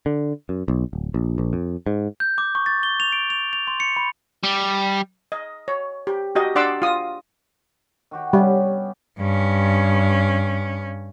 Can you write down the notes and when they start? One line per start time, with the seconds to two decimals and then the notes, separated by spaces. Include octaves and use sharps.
0.06 D3
0.49 F#2
0.68 B1
0.93 D1
1.14 A#1
1.38 A#1
1.53 F2
1.86 G#2
2.20 G6
2.38 D6
2.55 C#6
2.66 A6
2.83 G7
3.00 F7
3.13 D7
3.30 F7
3.53 F7
3.67 C6
3.80 C#7
3.96 B5
4.44 G3
5.32 D#5
5.68 C#5
6.07 G4
6.35 F#4 G4 D#5
6.55 D4 D5 F#5 C6 D6 E6
6.82 F4 D#6
8.11 D#3 F#4 G4
8.33 G3 B3 C#4 G4
9.19 G2 C#4